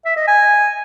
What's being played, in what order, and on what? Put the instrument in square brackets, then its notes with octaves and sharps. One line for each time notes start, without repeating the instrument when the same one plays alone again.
[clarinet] E5
D#5
G#5